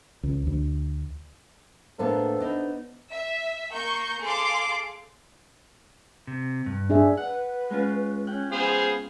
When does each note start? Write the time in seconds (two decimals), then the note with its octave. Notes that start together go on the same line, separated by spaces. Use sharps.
0.23 C#2
0.47 D2
1.99 A2 A#3 B3 D4 A4 B4 C5
2.40 B3 D4 D#4
3.12 E5
3.72 A#3 C#6 G6
4.21 G#4 A4 F5 C6 D6
6.27 C3
6.66 G2
6.90 D4 G#4 E5
7.17 B4 F#5
7.70 G#3 C#4 F4
8.27 C#4 G5 F#6
8.52 B3 G#4 C5 F5